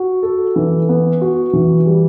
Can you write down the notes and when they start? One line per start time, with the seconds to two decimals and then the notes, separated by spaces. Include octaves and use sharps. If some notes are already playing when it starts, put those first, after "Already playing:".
Already playing: F#4
0.23 A4
0.56 E3
0.89 B3
1.21 F#4
1.53 E3
1.86 G3